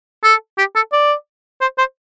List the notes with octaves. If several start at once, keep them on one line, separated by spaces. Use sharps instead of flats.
A4
G4
A4
D5
C5
C5